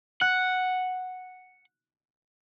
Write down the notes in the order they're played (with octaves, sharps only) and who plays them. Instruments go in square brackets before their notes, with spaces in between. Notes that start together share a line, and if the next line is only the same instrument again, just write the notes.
[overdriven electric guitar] F#5 [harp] F#6